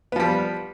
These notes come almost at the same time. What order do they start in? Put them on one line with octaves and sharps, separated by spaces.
B3 F3 G3